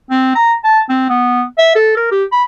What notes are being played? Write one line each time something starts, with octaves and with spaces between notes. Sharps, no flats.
C4
A#5
A5
C4
B3
E5
A4
A#4
G4
B5